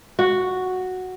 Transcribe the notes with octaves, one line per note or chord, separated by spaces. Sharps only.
F#4